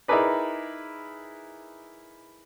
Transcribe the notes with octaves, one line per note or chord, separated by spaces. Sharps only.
D#4 E4 G#4 A#4 B4 D5